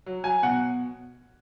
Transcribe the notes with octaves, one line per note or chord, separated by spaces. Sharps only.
F#3
F#3 G#5
B2 F#5